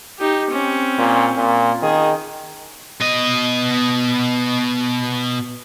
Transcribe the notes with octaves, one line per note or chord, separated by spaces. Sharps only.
D#4 G4
C4 C#4
A#2
A#2
D#3 G#4
B2 D#5